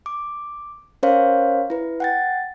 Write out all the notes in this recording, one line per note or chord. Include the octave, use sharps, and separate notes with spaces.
D6
C#4 A#4 C5 C#5 F5
E4 B4
F#5 G5 A6